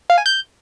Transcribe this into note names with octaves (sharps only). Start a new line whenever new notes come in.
F5
G#5
G6